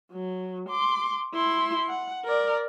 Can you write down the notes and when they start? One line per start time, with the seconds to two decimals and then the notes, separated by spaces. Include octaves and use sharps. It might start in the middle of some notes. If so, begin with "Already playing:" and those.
0.12 F#3
0.69 C6 D6
1.34 E4 C6
1.89 F#5
2.25 A#4 D5